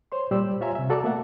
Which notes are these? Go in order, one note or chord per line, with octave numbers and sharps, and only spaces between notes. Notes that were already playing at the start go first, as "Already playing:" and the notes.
C5 C#5 C6
A#2 G3 G4 C5 D5 E6
F4 C#5 E5 G#5 A#5
C3 E5
F#4 A4 D5 A5 A#5 D6
A3 A#3 E5 F#5